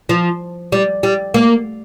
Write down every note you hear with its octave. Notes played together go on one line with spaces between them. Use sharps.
F3
G3
G3
A#3